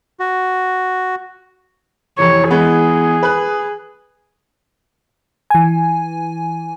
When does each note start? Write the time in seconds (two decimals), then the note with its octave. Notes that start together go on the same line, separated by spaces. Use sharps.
0.20 F#4
2.19 F2 C3 E3 C#5
2.51 E3 G#3 B3 G#4
3.23 B4 F#6
5.50 E3 G#5